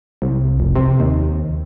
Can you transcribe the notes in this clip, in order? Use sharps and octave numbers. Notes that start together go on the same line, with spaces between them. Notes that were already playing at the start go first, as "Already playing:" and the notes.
C2
F1
C3
D#2